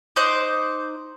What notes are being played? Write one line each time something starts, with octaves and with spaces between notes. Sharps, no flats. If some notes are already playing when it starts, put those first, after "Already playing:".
D#4 C5 D6 F#6